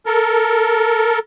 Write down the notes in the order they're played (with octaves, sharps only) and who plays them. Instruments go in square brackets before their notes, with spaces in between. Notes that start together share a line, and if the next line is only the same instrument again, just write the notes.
[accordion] A4 A#4